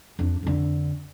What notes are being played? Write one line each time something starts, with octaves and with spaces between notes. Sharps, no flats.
F2 D4
F2 D3